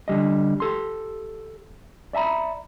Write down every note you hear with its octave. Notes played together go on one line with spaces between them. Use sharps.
D3 G3 D#5
G4 A4 C6
D5 E5 G#5 A#5 B5